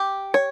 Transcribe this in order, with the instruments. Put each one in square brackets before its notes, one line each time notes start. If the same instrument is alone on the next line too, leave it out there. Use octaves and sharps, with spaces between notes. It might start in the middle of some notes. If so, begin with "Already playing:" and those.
Already playing: [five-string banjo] G4
C#5